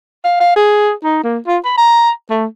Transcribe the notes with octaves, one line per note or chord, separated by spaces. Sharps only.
F5
F5
G#4
D#4
A#3
F4
B5
A#5
A3